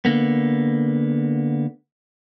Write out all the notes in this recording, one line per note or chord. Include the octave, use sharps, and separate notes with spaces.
D3 A#3 B3